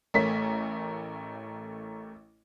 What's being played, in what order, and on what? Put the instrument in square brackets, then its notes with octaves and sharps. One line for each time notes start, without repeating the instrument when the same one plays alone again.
[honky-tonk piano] A1 A3 A#4 C#5 B6